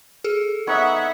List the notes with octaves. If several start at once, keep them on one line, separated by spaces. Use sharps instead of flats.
G#4 A4
B3 D#4 C#5 E5 F#5